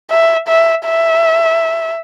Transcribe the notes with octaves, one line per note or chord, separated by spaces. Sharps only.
E5
E5
E5